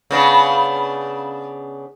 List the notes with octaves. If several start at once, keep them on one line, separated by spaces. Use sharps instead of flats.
C#3 B3 D4